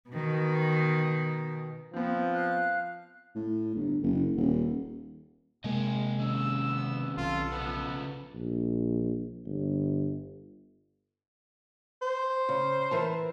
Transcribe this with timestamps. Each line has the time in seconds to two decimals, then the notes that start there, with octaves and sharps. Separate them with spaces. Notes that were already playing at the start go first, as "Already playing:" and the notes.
0.10 B2 D#3
1.93 F3 B3 C4
2.33 F5 F#6
3.35 A2
3.75 G1
4.03 F#1
4.36 D#1
5.64 C3 G#3 A#3 D#5 G5 G#5
6.19 D#3 C4 C#4 E6
6.69 B3
7.17 B1 F4 A4
7.52 C#3 F3 B3 B4
8.35 A#1
9.46 G1
12.02 C5
12.49 C#3
12.91 E3 A#4 A5